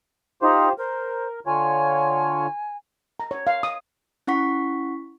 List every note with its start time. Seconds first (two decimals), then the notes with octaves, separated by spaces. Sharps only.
0.42 D#4 F4 G4 C5
0.78 A#4 C5
1.46 D3 F4 C#5 G#5
3.20 A#5
3.31 C#5
3.47 F5
3.63 D#6
4.27 C#4 E4 F#5 C#6 B6